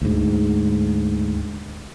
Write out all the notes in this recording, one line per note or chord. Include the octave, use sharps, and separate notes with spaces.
D2 G#2